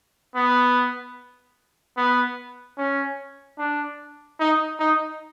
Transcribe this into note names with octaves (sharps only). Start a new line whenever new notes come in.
B3
B3
C#4
D4
D#4
D#4